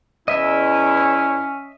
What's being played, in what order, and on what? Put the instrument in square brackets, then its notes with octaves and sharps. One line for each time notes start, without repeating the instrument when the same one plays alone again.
[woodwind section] E2 E4 [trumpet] C#4 [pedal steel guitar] D#5 E5